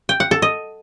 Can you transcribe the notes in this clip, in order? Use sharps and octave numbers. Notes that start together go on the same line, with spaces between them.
G5
F#5
A4
D#5